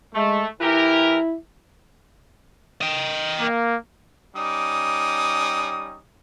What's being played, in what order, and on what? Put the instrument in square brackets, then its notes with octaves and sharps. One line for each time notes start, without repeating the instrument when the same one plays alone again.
[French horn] G#3 [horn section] A3
[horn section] E3 G4 A#4 [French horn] E4
[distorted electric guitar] D#5 G5
[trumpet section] A#3
G3 C#4 D#4 D6 D#6